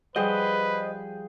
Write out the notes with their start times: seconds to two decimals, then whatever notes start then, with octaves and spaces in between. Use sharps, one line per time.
0.16 F3 G3 G#4 B4 C5 D#5 F#5 G5